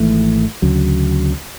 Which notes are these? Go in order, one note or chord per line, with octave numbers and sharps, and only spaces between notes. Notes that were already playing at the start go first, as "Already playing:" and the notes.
Already playing: G#1 G#2 E3 A3
D2 C#3 F#3